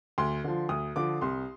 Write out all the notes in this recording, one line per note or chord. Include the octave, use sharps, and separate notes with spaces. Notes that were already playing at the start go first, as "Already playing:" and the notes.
D2 C6
D3 F3
D2 D#6
D3 F3 D6
C2 C6